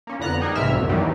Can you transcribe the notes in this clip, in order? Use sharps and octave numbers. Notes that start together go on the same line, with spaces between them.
A#3 C#4
F2 D3 B3 A#5 F#6
G3 D#4 G#4 A#4
A#1 G#2 C3 E3 E5 F6
C2 F#2 D3 D#3
E2 G2 D#3 E3 F#3 G3